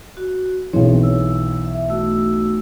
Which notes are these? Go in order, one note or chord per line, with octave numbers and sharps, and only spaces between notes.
F#4
B1 E3 C4 G#4 C#5
E6
E5
A3 F#4 E6